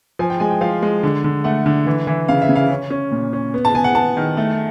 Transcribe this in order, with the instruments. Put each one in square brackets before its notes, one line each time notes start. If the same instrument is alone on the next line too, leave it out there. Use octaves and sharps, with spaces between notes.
[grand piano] F3 [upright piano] G#5
[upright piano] G5
[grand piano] G#3 [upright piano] G#5
[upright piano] G5
[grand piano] F3 [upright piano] F5
[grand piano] G#3
D3
D3
[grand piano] A3 [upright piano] F#5
[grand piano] D3
E3
E3
[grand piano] C#3 [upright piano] F5
[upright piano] E5
[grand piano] C#3
[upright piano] F5
[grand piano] C#4
C#4
A#2
C#4
B3
[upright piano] A5
[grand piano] B3 [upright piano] G#5
[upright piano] F#5
[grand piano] B3 [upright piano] A5
[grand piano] D#3
A3